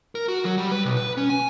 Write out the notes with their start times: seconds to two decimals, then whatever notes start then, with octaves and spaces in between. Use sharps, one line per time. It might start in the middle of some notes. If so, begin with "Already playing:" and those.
0.15 A#4
0.28 F#4
0.45 F#3
0.58 G3
0.71 B4
0.85 B1
0.97 B4
1.17 C#4
1.30 G#5